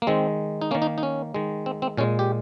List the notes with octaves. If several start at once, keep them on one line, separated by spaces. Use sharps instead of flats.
A#3
D#3 G#3 C4
D#4
D#3 A#3 C#4
D#4
D#4
C#4
D#3 G#3
C4
C4
A#2 G#3 C#4
G4